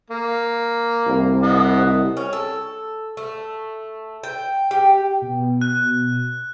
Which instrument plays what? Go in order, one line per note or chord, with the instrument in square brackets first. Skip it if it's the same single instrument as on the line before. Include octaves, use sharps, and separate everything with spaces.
[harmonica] A#3
[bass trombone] C2
[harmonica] D#5 F#5
[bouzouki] C#4
A4
A3
G5
G4
[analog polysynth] B2
[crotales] F#6